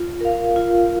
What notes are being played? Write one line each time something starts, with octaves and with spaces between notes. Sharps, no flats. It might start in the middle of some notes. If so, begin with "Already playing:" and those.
Already playing: F4
A#4 F5
F4